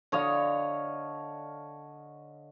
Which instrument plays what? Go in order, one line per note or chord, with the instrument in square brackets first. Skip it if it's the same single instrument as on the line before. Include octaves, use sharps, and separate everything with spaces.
[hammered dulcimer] D3 C#5 D#5 F5